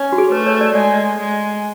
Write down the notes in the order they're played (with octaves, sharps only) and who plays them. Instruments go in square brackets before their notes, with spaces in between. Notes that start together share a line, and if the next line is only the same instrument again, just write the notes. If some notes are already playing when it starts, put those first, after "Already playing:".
Already playing: [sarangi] C#4
[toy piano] F#4
G#4
[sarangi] A3 [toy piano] B4
[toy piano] C#5
D5
[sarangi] G#3 [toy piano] D5
[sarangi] G#3